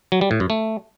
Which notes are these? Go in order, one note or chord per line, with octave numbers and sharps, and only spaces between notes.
F#3
G3
A2
F#2
A3